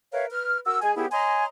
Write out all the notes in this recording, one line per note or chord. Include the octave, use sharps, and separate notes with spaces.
A#4 B4 C#5 E5 F5
B4 F6
F#4 A#4 E6
G#3 G#4 G#5
C2 B3 E4 G4 G#4
C#5 D#5 G#5 A#5 C6